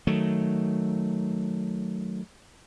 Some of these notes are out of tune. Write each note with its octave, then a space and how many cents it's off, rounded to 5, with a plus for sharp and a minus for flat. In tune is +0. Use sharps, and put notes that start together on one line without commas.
D#3 +0 F#3 +0 A3 +0